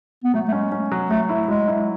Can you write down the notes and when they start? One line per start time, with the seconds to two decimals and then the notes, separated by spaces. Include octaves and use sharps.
0.24 B3
0.34 F#3 A3
0.48 A3
0.52 G#3 C#4
0.72 C#4
0.91 F#3
1.10 F#3 A3
1.29 E4
1.48 F#3 G#3
1.68 E4